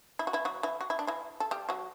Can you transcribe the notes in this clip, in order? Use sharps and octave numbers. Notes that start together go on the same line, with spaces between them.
E4
F#4
E3 E4
F#3 F#4
E3 E4
F#4
E4
D4
E3 E4
A4
G3 G4
F#3 F#4